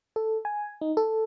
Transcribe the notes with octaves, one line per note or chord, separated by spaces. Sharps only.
A4
G#5
D#4
A4